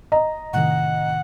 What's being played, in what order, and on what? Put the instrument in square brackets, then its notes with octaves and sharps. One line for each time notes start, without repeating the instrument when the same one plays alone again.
[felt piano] D#5 A#5
[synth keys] A2 C3 D#3 [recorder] F#5